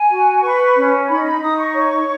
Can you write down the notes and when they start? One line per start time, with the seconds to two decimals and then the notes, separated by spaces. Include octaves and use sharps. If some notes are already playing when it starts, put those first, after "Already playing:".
Already playing: G#5
0.10 F#4
0.42 B4 C#6
0.76 C#4
1.08 D#4 B5
1.24 B5
1.41 D#4 D#6
1.57 C#6
1.74 C#5